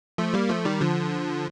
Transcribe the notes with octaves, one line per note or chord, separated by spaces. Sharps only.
F3 A3
G3 A#3
F3 A3
D#3 G3
D3 F3